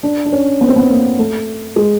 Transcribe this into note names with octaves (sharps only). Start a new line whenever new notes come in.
D4
D4
C#4
B3
C4
B3
A#3
A3
G#3